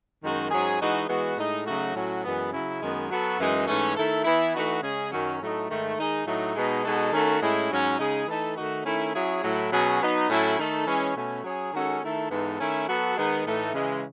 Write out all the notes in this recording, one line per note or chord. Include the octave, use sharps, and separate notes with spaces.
F#2 D#3 G#3 D#4 F#4
G#2 F#3 C#4 G#4
E3 G#3 D#4 F#4
E3 G#3 B3 F#4
A2 G#3 D#4
C#3 F#3 A3 D#4 F#4
A2 F#3 C#4 F#4
F#2 E3 G#3 B3
C#3 F#3 C#4 E4
F#2 D#3 G#3 B3
F#3 B3 F#4 A4
F#2 E3 G#3 D#4
G#2 E3 A3 C#4
D#3 A3 E4 A4
E3 B3 E4
E3 A3 D#4 F#4
C#3 G#3 C#4 G#4
F#2 D#3 F#3 C#4
A2 F#3 A3 D#4
G#2 D#3 A3
D#3 G#3 D#4 G#4
A2 F#3 A3 D#4
B2 G#3 B3 D#4
B2 G#3 D#4 F#4 A4
D#3 A3 C#4 F#4 A4
A2 G#3 C#4 E4
G#2 F#3 C#4
C#3 G#3 D#4 G#4
E3 A3 D#4 A4
D#3 A3 D#4 F#4
D#3 A3 C#4 E4
F#3 C#4 E4 G#4
A2 F#3 A3 E4
B2 F#3 C#4 G#4
F#3 B3 D#4
A2 F#3 C#4 E4 A4
D#3 A3 D#4 A4
E3 G#3 C#4
B2 A3 C#4
F#3 C#4 G#4
D#3 G#3 C#4 F#4 A4
D#3 A3 E4 A4
G#2 E3 B3 D#4 A4
D#3 A3 C#4 E4
F#3 B3 F#4 A4
D#3 G#3 B3 D#4 G#4
A2 E3 A3 D#4 A4
C#3 E3 G#3